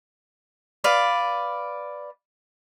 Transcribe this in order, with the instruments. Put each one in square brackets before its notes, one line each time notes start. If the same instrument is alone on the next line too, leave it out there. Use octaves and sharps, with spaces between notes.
[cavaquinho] B4 D5 F5